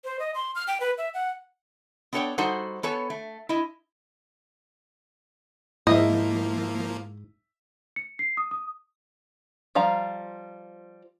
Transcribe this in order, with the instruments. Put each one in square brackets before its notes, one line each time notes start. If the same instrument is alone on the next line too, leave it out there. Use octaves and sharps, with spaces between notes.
[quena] C5
D#5
C6
F6
G5
B4
E5
F#5
[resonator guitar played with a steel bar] B3 D4 A4 C#5 F#5 G5
G3 D#4 F#4 A4 C5 F#5
B3 A4 C#5 G#5
A3
E4 D#5
[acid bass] G#2 [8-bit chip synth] F3 A#3 [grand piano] E4 E5 [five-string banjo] D#5
[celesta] C#7
C7
D#6
D#6
[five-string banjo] F3 G3 F5 A#5